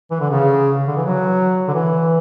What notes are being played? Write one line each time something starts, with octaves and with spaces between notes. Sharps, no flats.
E3
D3
C#3
D3
E3
F#3
D3
E3